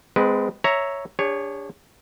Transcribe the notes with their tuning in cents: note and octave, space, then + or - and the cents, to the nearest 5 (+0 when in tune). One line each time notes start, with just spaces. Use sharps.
G#3 +0 C4 -35 B4 -15
C#5 +0 E5 +0 A#5 +0
D4 -15 G#4 -45 C#5 +0